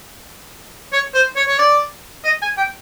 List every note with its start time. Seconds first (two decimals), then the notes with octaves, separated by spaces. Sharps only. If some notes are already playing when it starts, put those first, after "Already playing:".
0.93 C#5
1.14 C5
1.36 C#5
1.48 C#5
1.58 D5
2.24 D#5
2.42 G#5
2.57 G5